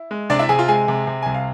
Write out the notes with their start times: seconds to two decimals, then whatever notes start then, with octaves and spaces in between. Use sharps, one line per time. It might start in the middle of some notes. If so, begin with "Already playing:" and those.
Already playing: E4
0.11 G#3
0.30 C3 D4 D5
0.39 E4 E5
0.49 C3 G#4 G#5
0.59 F4 F5
0.68 G#3 G#4 G#5
0.88 C3
1.07 C3
1.22 C2 G#5
1.34 F5